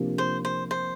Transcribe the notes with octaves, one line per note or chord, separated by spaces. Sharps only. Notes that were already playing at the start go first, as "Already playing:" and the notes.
Already playing: C3 F3 A#3 D4 G4
C5
C5
C5